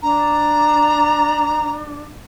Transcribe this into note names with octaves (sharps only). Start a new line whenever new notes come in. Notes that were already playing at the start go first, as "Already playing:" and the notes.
D4 A#5